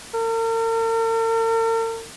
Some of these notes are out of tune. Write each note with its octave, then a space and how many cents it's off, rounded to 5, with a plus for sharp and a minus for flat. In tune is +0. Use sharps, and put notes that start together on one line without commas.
A#4 -45